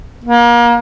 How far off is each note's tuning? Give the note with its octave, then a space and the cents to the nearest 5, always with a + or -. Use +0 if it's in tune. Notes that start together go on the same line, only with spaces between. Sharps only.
A#3 +30